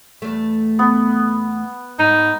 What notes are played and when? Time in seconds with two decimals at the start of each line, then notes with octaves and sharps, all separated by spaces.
0.22 E2 A3
0.79 B3
1.99 G#2 D#4